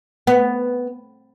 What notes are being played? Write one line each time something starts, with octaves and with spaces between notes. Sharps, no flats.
B3